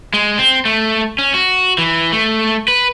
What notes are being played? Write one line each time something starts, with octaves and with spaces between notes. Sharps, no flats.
G#3
C4
A3
C#4
F#4
E3
A3
B4